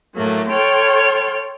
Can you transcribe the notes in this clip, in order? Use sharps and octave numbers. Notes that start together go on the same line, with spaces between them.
A2 F#3 A3 A#3
A4 C#5 G5 C6 F6